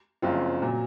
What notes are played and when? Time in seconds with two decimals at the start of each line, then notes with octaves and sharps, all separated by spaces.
0.22 F#1 F#2 F3 C4 F4
0.62 A#2 F#3